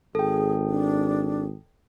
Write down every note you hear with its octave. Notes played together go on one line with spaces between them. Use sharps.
G#1 G#4 A4 G5
D4